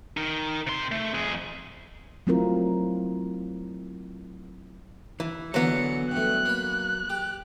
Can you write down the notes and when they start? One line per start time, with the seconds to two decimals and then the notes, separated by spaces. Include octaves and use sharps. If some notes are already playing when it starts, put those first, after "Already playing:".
0.17 D#4 A#4
0.67 C3 C6
0.92 A3
1.14 F2 G#4
2.27 F#3 A3 C4 E4 F4 A#4
5.20 E3
5.54 D3 E3 F#3 B3 D4 C#7
6.11 G2 A3 F#6
6.45 A#3 B5
7.10 G4